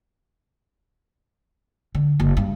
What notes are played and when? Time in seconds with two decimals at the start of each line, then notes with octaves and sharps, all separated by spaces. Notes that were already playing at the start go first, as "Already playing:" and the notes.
1.95 D3
2.20 F#1
2.37 G2